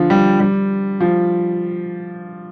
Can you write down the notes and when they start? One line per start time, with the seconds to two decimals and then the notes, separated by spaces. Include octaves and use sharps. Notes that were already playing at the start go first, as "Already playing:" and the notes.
Already playing: D3 F3
0.10 G3
0.40 G3
1.00 F3